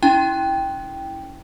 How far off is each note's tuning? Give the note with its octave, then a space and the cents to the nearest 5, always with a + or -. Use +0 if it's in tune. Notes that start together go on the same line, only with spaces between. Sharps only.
C#4 +40 E4 -5 G5 +0